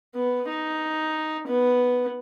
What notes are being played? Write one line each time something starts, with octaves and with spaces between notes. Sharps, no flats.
B3
D#4
B3